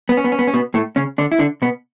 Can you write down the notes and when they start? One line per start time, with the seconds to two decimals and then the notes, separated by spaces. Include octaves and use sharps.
0.09 B3
0.17 C#4
0.24 B3
0.32 C#4
0.39 B3
0.47 C#4
0.54 B2 B3
0.74 A2 A3
0.96 C#3 C#4
1.18 D3 D4
1.32 E4
1.39 D3 D4
1.62 B2 B3